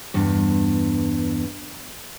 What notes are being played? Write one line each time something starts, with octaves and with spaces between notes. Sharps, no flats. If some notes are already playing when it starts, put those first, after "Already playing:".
E2 G2